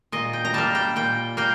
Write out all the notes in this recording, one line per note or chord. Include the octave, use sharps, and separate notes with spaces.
A#2 D#5
G5
A#5
G3 A#3 A5
G5
A#2 G5
A#3 G5